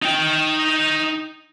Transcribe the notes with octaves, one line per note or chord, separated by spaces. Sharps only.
D#4 G5